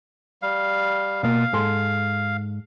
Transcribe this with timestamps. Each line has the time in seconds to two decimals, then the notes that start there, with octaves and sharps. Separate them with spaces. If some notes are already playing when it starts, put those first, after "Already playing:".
0.42 G3 F5
1.23 B2 A#3 F5
1.53 G#2 A4 C6